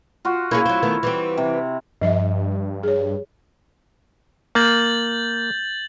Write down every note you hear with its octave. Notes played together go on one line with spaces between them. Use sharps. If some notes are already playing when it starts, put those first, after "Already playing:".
F4 F#4
A#3 C#4 E4 G#4
F#3 C4
D#3 A3 B3
E3 G3 C4
C3
G2 F3 D#5 E5
G#4 C#5
A#3 G6 A6 F#7